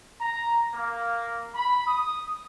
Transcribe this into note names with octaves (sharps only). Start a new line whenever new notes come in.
A#5
A#3
B5
D#6